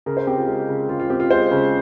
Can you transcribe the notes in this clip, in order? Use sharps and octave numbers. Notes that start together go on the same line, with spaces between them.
C#3 A#4
C5
C4 G4
F4
G#3
C#3
C#3 F4
F4
C4 G4
F4
G#3 C5
C#3